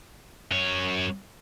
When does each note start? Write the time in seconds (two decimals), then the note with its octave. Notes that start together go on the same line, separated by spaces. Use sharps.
0.51 F#2 C#5